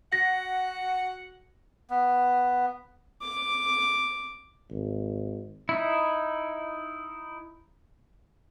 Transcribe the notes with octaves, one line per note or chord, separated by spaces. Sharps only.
F#4 F#5 A#6
B3
D6
G#1
D#4 E4